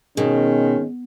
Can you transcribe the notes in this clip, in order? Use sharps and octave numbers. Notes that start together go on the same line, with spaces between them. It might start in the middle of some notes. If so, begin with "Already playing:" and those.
B2 D#3 G#3 C#4